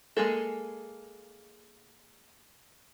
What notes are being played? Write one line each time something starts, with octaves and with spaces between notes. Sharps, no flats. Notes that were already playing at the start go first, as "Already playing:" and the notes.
G#3 A#3 G#4 A4